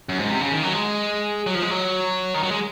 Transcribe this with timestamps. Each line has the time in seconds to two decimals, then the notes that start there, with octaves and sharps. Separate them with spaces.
0.09 F#2
0.19 G#2
0.30 C3
0.41 C#3
0.52 D#3
0.62 F#3
0.73 G#3
1.46 F#3
1.55 F3
1.62 G#3
1.71 F#3
2.34 D#3
2.43 F#3
2.51 G#3